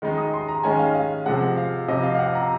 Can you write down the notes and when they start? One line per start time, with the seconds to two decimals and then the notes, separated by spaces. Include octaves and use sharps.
0.02 D#3 G#3 D#4
0.18 D#6
0.34 C6
0.48 A#5
0.64 D#3 G#3 C#4 G#5
0.79 F5
0.95 F5
1.26 C3 F3 G#3 F#5
1.57 F5
1.88 F2 C3 F3 D#5
2.03 F5
2.15 F5
2.19 F#5
2.35 A#5